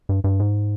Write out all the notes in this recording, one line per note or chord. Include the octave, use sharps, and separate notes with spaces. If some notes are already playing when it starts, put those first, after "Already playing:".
G2
G2
G#2